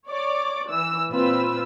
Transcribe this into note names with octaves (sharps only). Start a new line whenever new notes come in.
C#5 D5 D6
E3 E6
A#2 C4 F4 B4 E6